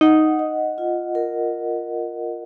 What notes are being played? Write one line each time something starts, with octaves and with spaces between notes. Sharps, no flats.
D#4 F#5
D#5
F4
A#4